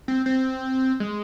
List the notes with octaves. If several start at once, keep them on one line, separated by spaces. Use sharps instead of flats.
C4
C4
G#3